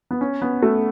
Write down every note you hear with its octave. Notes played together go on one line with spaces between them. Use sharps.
B3
C#4
B3
A3